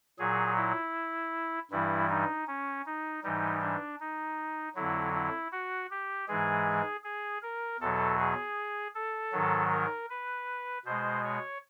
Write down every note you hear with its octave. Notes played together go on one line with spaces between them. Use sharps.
A#2 F#3 G#4
E4
G2 E3 G3 E4
D#4
C#4
D#4
G#2 E3 G3 D#4
D4
D#4
F2 D3 F#3 E4
E4
F#4
G4
G#2 E3 G#3 G#4
G#4
A#4
E2 B2 F#3 A4
G#4
A4
G#2 D#3 F#3
A#4
B4
B2 G#3 C5
C#5